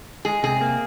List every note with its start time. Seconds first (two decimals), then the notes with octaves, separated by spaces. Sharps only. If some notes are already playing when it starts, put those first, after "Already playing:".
0.25 G#3 G#4
0.43 C3 G#4
0.61 A#3